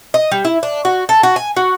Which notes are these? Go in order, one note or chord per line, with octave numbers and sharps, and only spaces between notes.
D#5
G3
E4
D4
F#4
A4
F#4
G#5
F#4